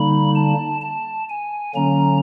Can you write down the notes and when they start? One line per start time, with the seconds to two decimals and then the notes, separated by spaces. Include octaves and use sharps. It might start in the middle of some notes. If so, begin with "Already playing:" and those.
Already playing: D3 G3 A#3 D#4 B5
0.35 A5
0.81 A5
1.29 G#5
1.75 D3 F#3 A#3 C#4 A#5